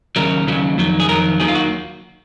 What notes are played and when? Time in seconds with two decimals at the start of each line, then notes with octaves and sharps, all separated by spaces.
0.16 D#2 C#3 F#3 A#4
0.47 D#2 C#3 F#3
0.78 F2 D#3 F#3
1.00 G#4
1.09 F2 D#3 F#3 A#4
1.40 D#2 D#3 F#3 G#4
1.48 F4
1.55 F#4